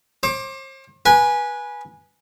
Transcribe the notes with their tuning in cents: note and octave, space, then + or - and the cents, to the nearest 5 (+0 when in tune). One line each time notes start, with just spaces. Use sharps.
C5 +40 D6 +0
B4 -20 G#5 +0